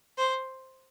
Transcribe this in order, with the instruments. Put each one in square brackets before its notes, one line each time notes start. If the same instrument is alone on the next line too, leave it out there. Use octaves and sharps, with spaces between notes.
[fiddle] C5